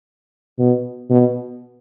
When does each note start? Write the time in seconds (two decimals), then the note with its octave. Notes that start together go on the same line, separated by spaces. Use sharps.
0.59 B2
1.10 B2